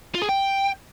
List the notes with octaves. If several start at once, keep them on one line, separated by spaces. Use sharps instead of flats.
F4
G#4
G5